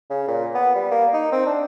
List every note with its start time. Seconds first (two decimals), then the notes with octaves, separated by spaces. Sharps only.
0.10 C#3
0.28 A#2
0.54 B3
0.75 G3
0.91 A#3
1.13 D#4
1.32 C4
1.46 D4